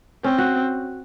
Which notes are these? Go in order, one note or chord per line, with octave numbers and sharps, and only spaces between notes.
C4 C#4
F#4